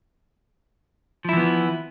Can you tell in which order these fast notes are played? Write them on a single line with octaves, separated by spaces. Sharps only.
F3 E4 E3 B3